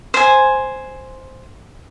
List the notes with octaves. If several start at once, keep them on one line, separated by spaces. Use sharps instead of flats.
C5 G#5